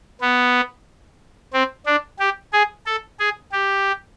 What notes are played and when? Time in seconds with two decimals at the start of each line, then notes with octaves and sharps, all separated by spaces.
0.21 B3
1.53 C4
1.86 D4
2.19 G4
2.53 G#4
2.86 A4
3.20 G#4
3.52 G4